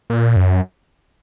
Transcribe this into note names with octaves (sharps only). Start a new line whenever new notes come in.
A#2
F#2